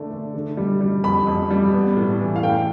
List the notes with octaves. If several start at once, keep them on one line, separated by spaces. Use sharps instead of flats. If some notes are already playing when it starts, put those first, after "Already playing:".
Already playing: D3 A3 D4
A3
D3
G3
G3
F2 B5
F2
G3
B3
A2
E3
F5
A3 G5